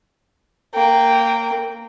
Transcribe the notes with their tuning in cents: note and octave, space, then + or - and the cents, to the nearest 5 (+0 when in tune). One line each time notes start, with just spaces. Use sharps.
A#3 -15 G5 +0